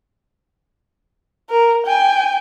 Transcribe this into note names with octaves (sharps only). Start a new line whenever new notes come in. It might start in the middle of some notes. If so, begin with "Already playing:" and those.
A#4
G5 G#5